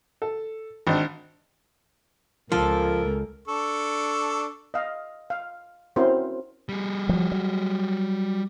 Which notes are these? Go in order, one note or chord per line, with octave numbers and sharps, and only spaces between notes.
A4
G#1 D4
C#2 F3 A4 A#4
D4 A4 C#6
D#5 F5
F5
C4 C#4 E4 F#4 A#4 C5
G3 G#4
F3 F#3
F#3